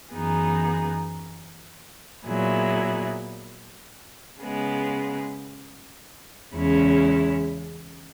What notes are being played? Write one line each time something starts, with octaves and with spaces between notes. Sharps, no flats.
F#2 E3 B3 D#4 G#4
A#2 F#3 B3 E4 G#4
C#3 G#3 B3
E2 C#3 G#3 C#4 E4